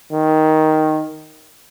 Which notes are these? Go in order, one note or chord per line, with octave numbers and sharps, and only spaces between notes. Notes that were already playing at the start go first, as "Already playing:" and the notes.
D#3